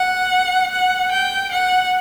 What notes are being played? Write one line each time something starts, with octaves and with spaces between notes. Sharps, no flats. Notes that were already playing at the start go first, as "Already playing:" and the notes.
Already playing: F#5
F#5
G5
F#5